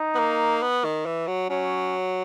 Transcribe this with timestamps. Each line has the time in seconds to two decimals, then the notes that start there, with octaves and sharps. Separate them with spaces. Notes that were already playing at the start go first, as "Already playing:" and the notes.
Already playing: D#4
0.15 B3
0.19 A#3
0.63 B3
0.84 D#3
1.06 E3
1.27 F#3
1.49 F#3 C#4